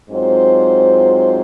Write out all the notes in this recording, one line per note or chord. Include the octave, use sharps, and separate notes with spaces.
G#2 F#3 C4 F4 C5